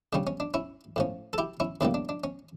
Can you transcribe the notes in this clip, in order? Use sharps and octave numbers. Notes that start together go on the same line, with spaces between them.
C#3 G3 C#4 D4
C#4
D4
C#4 E4
A2 F3 C#4
A4
E4 G4
C#4 E4
E2 C#3 E3 G3 A#3 D4
D4
D4
C#4